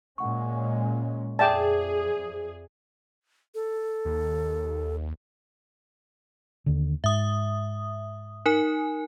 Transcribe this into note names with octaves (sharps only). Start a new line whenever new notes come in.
A#2 G#3 C#4 F#5 C#6
F2 G#4 D5 E5 G5 A5 D6
A4
D#2
D#2 D3
G#2 E5 D#6
D#4 A#4 G#5